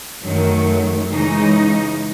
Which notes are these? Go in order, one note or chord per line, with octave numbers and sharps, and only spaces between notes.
F#2 D#3 F#3 A3
C#3 E3 G#3 D#4